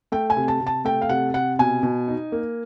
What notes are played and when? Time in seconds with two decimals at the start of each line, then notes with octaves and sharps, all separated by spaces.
0.12 A3 G5
0.30 G#5
0.37 C3
0.48 A5
0.60 C3
0.67 A5
0.85 A3 G5
1.02 F5
1.09 C3 F#5
1.34 C3 F#5
1.59 B2 G#5
1.83 B2
2.08 D#4
2.32 A#3